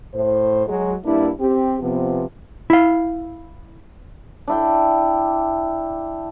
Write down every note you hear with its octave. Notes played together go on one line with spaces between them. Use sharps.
A2 C5
F#3 G#3
G2 G3 A#3 D4 E4
C4 G4
C3 F3 B3
E4 F5
D4 E4 G5